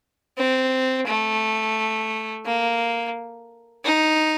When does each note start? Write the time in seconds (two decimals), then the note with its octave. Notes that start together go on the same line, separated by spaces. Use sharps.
0.38 C4
1.07 A3
2.46 A#3
3.84 D#4